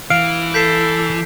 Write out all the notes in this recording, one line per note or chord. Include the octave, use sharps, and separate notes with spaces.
E3 F5 D7
A4 G6 B6 C7